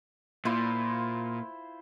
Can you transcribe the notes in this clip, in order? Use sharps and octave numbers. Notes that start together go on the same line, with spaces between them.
A#2 E4 F4 C5